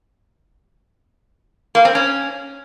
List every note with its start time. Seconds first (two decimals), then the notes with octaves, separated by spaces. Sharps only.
1.75 A#3
1.85 C4
1.95 C#4